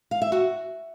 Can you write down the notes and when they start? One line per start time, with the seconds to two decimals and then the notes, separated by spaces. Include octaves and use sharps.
0.11 F5
0.22 E5
0.32 F#4